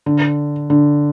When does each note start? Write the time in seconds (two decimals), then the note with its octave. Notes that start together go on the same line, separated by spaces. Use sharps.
0.06 D3
0.70 D3